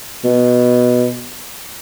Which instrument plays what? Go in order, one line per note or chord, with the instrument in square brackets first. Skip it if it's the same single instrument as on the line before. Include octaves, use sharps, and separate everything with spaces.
[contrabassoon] B2